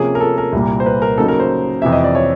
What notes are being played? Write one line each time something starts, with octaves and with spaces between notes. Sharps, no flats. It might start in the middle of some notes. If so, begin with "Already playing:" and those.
Already playing: C3 F3 A#3 C#4 G#4
A#4
A4
A#4
C2 A#2 G3 A#3
C5
B4
A#4
C#3 F#3 A#3 D#4 A4
A#4
C5
F2 C3 E3 E5
D#5
D5
C#5